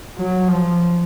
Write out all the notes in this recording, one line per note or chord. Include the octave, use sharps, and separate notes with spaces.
F#3
F3